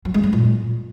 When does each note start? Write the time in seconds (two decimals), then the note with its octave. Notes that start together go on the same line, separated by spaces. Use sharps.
0.05 F#3
0.14 G#3
0.23 G3
0.33 A#2